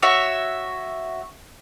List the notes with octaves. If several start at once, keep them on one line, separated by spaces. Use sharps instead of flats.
F#4 C#5 E5